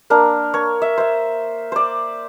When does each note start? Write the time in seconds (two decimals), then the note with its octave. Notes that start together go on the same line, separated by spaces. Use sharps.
0.10 A#3 D4 A#4
0.54 A#4 C#5
0.82 E5
0.98 C5 E5
1.72 C5 D5